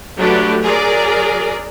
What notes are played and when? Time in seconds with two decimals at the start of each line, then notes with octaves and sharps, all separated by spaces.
0.16 F#3 A3 D4 G4 B4
0.64 F#3 G#4 A#4 D5